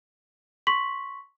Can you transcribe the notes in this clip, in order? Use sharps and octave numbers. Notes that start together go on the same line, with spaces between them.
C6 C#6 B6 F#7